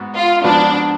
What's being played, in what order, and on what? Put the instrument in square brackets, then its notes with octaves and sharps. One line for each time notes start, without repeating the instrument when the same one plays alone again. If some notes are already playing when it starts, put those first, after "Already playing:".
Already playing: [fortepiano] G#2 B3 F#4
[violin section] F4
[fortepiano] G#2 F3 B3 F#4 B4 [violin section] D4